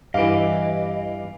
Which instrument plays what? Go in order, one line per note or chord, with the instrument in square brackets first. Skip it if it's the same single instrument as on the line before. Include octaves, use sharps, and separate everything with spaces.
[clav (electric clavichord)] G2 [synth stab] E3 D6 [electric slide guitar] D#5 [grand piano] F5 D7